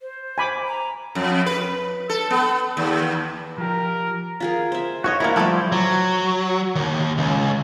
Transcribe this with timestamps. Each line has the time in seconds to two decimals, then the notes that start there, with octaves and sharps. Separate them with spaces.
0.01 C5
0.38 G#5 B5 D6
0.67 A#5
1.15 F2
1.46 B4
2.09 A4
2.30 B3
2.77 D#2
3.58 F3 G4 A#4
4.40 F4 G#4 A#4
4.72 C5 E5
5.04 F3 F#4 C#5 D#5
5.20 A#3 D4 E4 F#4 A#4
5.36 F3 G3 A3 E4 G4 A4 B4 C5
5.72 F#3
6.76 D#2
7.18 C#2